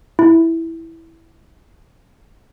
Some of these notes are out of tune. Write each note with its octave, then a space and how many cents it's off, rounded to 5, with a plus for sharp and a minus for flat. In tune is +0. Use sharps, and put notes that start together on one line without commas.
E4 -5